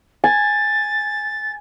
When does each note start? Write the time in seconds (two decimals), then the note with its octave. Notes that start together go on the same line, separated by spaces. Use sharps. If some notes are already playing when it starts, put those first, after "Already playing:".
0.24 G#5 A6